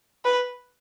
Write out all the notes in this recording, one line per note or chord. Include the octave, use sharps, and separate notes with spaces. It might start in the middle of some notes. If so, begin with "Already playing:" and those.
B4